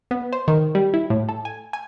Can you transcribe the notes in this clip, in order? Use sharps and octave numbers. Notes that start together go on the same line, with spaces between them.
B3
C5
D#3
G3
E4
A2
A4
G#5
G#5